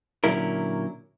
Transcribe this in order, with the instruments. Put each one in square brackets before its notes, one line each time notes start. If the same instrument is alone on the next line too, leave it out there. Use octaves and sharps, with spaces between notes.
[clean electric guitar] A#2 D3 F#3 C#4 E4 A#4